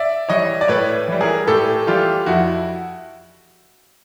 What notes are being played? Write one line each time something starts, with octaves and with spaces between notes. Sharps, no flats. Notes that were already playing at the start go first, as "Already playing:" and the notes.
Already playing: D5 E5
E3 G3 C#5 D#5
D5
A2 B4 C#5
E3 G3
G#4 A#4
A2 G4 A4
E3 G3 F4 G4
F2 E4 F#4